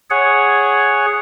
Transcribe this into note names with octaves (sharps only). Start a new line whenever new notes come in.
G#4 C#5 F#5